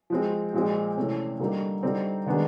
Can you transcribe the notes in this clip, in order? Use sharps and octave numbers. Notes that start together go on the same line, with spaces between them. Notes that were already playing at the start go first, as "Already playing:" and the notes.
F3 G#3 C4
A#2 F3 G#3 C4
C3 E3 A3 C#4
D3 G3 A#3 D#4
D3 G3 C4 D#4
D#3 G#3 B3 D4